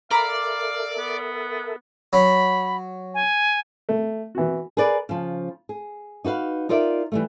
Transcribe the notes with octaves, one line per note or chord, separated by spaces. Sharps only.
A4 A#4 D5 E5 F5 A#5 B5 D6
B3
F#3 B5
G#5
A3
E3 F#4
G#4 A#4 B4 D5
C#3 F3
G#4
D#4 F#4 B4 F5
D#4 F4 A#4 D5 E5
E3 G3 A3